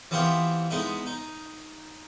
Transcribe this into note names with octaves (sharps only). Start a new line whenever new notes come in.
E3 B3 C4 E4 F4 G4
G#3 B3 D#4 E4
D#4